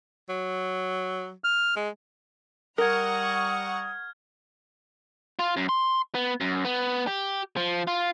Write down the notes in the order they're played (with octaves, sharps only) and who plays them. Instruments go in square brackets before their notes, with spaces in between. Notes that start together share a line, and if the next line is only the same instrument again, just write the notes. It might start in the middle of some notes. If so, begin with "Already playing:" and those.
[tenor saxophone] F#3
[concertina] F6
[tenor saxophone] G#3
[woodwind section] G3 D#6 [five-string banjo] A#4 [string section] F#5 A#5 C#6 [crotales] F6 G#6
[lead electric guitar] F4
F#2
C6
B3
F#2
B3
G4
F3
F4